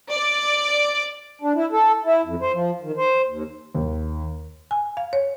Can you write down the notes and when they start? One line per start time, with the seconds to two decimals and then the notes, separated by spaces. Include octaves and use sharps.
0.11 D5
1.42 D4
1.55 E4
1.72 A4
2.04 E4
2.25 F2
2.41 C5
2.53 F3
2.82 D#3
2.97 C5
3.27 D#2
3.75 D#2
4.71 G#5
4.97 F5
5.13 C#5